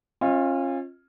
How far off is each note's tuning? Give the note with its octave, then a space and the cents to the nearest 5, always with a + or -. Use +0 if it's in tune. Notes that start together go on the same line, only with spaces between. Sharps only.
C#4 -35 F4 +0 D#5 +30